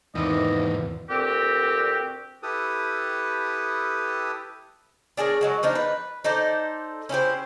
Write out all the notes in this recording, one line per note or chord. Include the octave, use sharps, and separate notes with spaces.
E2 G#2 C3 D#3 E4 D5 D#5
D2 A#2 C4 F#4 G4
E4 G4 A4 B4 D#6
D4 G#4 A#4 C#5
F#3 G#3 F#4
F3 D4 D#4
B4
D#4 A4 C5 D5
C#4 E4 G4 C5